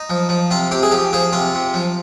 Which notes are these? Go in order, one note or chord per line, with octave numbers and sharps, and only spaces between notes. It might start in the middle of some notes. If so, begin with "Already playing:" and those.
Already playing: D#4
F3
F3
C3 F4
C3 G4
G#4
F3 G4
F3 G#4
C3 F4
C3
F3